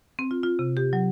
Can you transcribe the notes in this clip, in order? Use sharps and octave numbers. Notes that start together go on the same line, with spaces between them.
C4
F4
F4
C3
G4
F#3